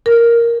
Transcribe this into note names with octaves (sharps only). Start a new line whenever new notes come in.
A#4